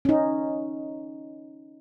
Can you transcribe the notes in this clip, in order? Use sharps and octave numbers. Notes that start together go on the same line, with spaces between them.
C#4 D#4